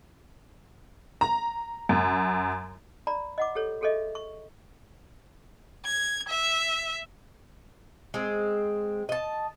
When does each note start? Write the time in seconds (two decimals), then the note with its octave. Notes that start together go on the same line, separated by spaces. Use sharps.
1.21 A#5
1.89 F#2
3.07 D5 A#5 B5
3.38 D#5 F#5 D6
3.55 G4 A4 C#5
3.81 F#4 G#4 A4 C#5 D#5 E5
4.15 C#6
5.85 G#6
6.28 E5
8.14 G#3 C4
9.09 D#5 A5